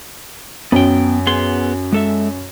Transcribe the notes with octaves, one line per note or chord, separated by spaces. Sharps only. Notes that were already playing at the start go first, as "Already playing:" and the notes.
F#2 B3 G5
B3 G#4 C6
G#3 A4 E5